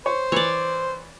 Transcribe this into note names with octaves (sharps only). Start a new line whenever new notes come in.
C5 C#5
E3 C#5 D5